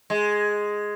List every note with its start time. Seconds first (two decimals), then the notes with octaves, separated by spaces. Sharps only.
0.10 G#3